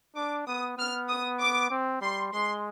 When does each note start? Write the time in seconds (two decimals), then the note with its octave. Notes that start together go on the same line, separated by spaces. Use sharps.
0.16 D4 D6
0.47 B3 D#6
0.78 B3 F6
1.08 D#6
1.40 D6
1.70 C4
2.02 G3 C6
2.33 G#3 C6